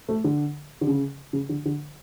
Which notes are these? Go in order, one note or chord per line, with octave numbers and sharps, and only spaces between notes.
A3
D3
D3
C#3
C#3
D3
D3